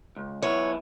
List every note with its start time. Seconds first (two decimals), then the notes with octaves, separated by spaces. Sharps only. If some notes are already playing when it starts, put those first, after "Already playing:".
0.16 C#2
0.42 B1 B3 E4 C#5